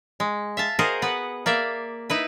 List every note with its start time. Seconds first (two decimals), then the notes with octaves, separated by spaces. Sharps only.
0.20 G#3
0.57 E5 F5 A5
0.79 F#4 G#4 A#4 C5 D#5 F5
1.02 B3 B4 F#5
1.46 A#3 D5 E5 F5
2.10 D#4 E4 B4